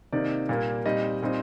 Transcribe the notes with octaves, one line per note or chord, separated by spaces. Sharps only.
C3 D#3 A#3 D#4 D5
A#2 G3 A#3
A#2 G3 C4 D#4 D#5
A#2 G3 C4 D#4